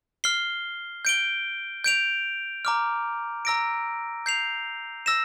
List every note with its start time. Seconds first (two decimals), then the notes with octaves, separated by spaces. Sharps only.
0.24 F6 C7 G7
1.05 G6 D7 G7
1.84 G6 D7 F7
2.65 A#5 D6 F6
3.45 A#5 E6 A#6 D7
4.26 G6 C7 F7
5.06 E6 A#6 E7